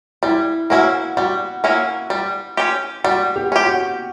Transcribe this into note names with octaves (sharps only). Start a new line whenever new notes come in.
G3 E4
A#3 C#4 E4 F#4
G3 F#4
A#3 C#4 E4
G3
C#4 G4
G3 F#4
G4
C#4 G4
F#4